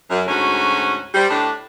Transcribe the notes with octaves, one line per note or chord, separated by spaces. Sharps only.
F#2
D2 G#2 C#4 F#4
G3 C5
A2 D4